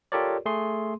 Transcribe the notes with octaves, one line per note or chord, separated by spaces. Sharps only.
F4 G4 A4 A#4 C#5 D5
A3 G#4 C6